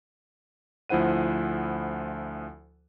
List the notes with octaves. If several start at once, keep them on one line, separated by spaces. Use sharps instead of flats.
D2 F3 E4 C5 F#5 D#7